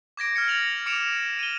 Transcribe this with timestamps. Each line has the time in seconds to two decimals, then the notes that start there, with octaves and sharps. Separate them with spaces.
0.17 D6 G#6 A#6 D7
0.36 F6 G#6 C#7
0.48 A6 A#6 F7 F#7
0.86 D6 C#7 D7 E7 F7
1.39 D#7 G7